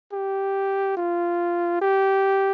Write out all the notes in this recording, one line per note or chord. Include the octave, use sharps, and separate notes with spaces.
G4
F4
G4